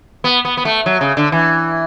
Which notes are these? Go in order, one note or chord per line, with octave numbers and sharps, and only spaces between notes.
B3
B3
B3
A3
F#3
C#3
D3
E3